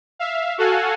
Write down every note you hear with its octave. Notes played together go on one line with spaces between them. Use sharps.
E5 F5
F#4 A4 F5 F#5 G#5